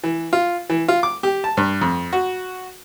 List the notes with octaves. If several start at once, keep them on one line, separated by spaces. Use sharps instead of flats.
E3
F4
E3
F4
D6
G4
A5
G2
F2
F#4